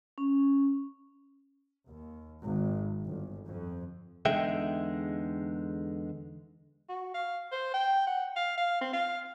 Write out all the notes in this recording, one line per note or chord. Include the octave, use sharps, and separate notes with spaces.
C#4
D#2
G#1
G1
F2
E2 D3 G#3 D#4 E5 G5
F#4
F5
C5
G5
F#5
F5
F5
C4
F5